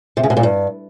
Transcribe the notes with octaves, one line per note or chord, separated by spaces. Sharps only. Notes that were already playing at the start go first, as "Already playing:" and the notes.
C3
C#3
B2
A#2
G2